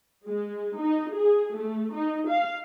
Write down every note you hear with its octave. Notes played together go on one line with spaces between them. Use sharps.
G#3
D#4
G#4
A3
D#4
F5